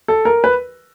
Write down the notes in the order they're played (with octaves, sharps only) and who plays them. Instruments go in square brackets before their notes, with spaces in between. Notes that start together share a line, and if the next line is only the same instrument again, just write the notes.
[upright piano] A4
A#4
B4